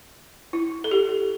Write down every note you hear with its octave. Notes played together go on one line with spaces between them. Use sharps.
E4
A4
G4